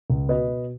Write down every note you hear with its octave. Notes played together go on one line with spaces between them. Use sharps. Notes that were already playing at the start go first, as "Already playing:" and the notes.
C#2
B2 B4 D#5
B2